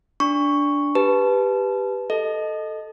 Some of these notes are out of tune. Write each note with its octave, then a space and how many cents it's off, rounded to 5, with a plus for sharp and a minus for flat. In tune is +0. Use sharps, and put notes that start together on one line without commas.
D4 -10 C#6 +0
G4 +5 B4 +0 A5 -25
A4 +0 D#5 +0